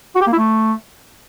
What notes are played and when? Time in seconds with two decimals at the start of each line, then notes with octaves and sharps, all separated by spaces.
0.16 F#4
0.21 G4
0.27 A#3
0.33 E4
0.38 A3